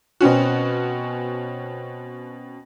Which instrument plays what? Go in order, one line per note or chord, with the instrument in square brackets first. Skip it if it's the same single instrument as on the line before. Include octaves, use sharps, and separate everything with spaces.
[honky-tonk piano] B2 C4 C#4 F#4